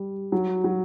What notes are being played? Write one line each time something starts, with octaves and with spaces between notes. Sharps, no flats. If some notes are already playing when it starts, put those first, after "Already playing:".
Already playing: G3
F#3
F#3